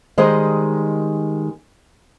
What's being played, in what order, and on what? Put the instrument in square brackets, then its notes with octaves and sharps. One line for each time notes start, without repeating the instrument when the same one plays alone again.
[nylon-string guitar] D#3 G3 G#3 C5 D#5